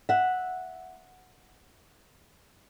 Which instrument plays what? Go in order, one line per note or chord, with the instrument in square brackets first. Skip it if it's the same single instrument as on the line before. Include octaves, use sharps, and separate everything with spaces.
[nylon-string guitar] E5 F#5